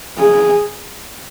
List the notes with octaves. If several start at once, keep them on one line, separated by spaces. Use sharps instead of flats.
G#4